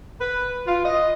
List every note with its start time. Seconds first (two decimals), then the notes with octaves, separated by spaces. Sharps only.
0.20 B4
0.67 F4
0.84 D#5